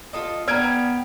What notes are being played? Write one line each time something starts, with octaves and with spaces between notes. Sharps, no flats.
F4 A4 D#5
B3 D5 G5 A#5 F6 G#6 D7